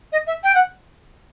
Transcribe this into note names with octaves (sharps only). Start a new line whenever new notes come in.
D#5
E5
G5
F#5